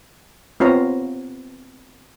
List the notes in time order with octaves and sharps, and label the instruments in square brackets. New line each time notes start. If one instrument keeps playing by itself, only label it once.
[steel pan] B3 C4 F4 C#5 F5 A#5